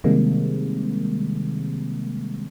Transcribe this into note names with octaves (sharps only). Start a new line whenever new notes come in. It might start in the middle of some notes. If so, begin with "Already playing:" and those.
C3 D#3 G3 G#3 A#3 C4